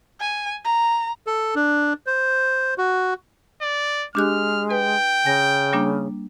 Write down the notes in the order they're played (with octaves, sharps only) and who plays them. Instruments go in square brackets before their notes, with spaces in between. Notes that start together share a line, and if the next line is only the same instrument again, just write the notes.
[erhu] G#5
A#5
[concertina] A4
D4
C5
F#4
[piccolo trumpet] D5
[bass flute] G#3 [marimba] D4 G4 F#6 [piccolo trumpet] F6
[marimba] B4 [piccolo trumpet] G5
[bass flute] C#3 [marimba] G#5 A#6
[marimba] G3 A#3 D4